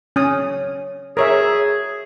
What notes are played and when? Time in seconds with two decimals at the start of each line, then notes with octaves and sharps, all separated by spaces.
0.16 C#4 D#6
1.17 G#4 A#4 C#5 E5